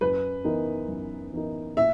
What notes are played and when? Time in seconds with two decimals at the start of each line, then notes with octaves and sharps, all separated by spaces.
0.01 F#2 B4
0.44 E3 B3 D#4 A#4
0.88 F#2
1.33 E3 B3 D#4 A#4
1.77 A#2 E5